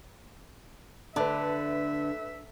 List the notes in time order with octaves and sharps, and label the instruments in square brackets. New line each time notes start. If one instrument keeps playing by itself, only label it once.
[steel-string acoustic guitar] D3 [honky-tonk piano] A3 B4 [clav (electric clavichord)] D4 [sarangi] E5